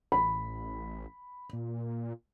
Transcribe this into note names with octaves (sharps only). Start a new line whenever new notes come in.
A1 B5
A#2